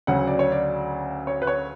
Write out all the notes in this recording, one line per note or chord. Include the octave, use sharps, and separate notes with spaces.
D2 C#3 F#3 F#5
D5
C#5
D5
C#5
B4
C#5